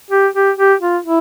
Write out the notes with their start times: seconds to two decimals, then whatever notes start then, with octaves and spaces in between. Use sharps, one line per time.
0.11 G4
0.34 G4
0.57 G4
0.81 F4
1.05 E4